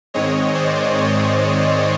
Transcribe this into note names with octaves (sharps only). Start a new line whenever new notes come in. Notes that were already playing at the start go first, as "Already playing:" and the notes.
G#2 D#3 G#3 C4 C#5 D#5
C5 D5
C#5 D#5